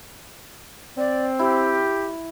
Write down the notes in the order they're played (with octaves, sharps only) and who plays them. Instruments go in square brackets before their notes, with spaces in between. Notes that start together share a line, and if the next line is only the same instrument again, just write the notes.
[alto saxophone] C4 [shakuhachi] D5
[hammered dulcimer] E4 [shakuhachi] G4